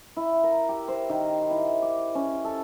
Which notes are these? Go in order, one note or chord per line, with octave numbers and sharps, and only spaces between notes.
E4
A#4
G4
C5
D#3
E4
D6
C#4
A4